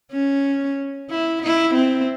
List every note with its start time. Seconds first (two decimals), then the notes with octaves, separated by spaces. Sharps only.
0.12 C#4
1.10 E4
1.42 E4
1.75 C4